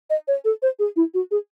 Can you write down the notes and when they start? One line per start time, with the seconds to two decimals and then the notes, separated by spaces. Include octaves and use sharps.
0.10 D#5
0.28 C#5
0.45 A4
0.62 C5
0.79 G#4
0.96 E4
1.14 F#4
1.31 G#4